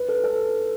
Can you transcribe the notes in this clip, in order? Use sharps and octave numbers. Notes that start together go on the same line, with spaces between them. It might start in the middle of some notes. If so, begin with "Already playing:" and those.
Already playing: B4
A4
A4